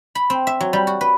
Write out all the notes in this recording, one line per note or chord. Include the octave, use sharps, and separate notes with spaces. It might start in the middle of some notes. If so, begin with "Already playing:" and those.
B5
C4
E5
F#3
G3
F#4
B4